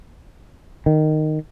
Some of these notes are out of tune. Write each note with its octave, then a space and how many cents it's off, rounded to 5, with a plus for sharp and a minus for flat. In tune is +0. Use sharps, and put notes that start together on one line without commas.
D#3 -10